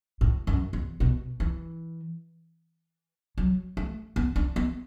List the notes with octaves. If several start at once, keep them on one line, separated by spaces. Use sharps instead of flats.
A2
F#2
E2
B2
E3
F#3
A3
B3
D4
B3